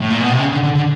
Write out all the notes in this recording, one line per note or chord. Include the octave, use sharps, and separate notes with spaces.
A2
A#2
B2
C3
C#3
D3
D3
D3